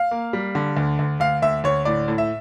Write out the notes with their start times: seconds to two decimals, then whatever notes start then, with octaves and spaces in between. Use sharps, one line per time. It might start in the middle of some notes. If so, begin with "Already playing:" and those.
Already playing: F5
0.11 A#3
0.33 G3
0.55 D3
0.77 D2
0.99 D2
1.20 D2 F5
1.42 D2 E5
1.64 D2 C#5
1.85 A2 D5
2.08 A2
2.18 E5